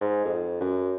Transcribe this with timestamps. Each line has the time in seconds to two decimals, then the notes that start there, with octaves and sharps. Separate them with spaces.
0.01 G#2
0.25 F2
0.61 F#2